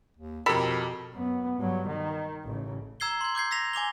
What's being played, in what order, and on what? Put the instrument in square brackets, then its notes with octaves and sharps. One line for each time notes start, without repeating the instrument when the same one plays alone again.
[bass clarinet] D#2
[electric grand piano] F2 G4 A#4 [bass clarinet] B2 [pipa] A4 B5
[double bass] F#2 B3
G2 F#3
D#3
A1 C#3
[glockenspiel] A#5 E6 G#6 C7 G7
C6 G#6
D6 G6 G#6 C7
E6 A#6 B6 F7
G#5 D6 F7 G7